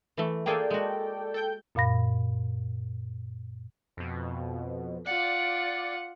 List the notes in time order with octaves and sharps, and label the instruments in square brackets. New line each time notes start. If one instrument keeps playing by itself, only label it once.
[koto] E3 A3
[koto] A#3 F4 G#4 [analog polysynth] A4 D5 G5
[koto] G#3 F#4
[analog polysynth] A4 G5 G6
[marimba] F#2 A#2 F5 B5 A#6
[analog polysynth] F2 B2
[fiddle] F4 F#5 [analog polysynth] D5